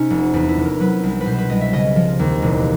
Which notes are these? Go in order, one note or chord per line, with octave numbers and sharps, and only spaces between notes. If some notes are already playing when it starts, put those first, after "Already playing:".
Already playing: C3 C#4 D#4
F1
E2 D4
E4
F1
A#4
F#3 B4
C2
B4
B2 C5
B4
C2 D#5
E5
C#3 D#5
F3
D#2
E1